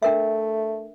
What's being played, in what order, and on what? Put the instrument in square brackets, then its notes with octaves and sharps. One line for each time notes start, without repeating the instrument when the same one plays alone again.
[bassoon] A3 [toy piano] D4 A#4 E5